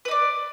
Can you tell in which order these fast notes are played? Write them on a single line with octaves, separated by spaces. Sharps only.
B4 D#5 D5